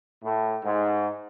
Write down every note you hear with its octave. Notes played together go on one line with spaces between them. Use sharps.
A2
G#2